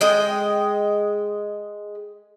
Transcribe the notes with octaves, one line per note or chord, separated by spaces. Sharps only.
G#3 D#5 G5